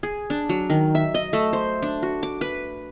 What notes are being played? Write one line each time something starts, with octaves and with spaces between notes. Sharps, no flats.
G#4
D4
F#3
D#3
E5
D#5
A3
C5
D4
F#4
D6
B4